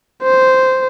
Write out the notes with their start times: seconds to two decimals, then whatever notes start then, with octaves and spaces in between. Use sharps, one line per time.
0.23 C5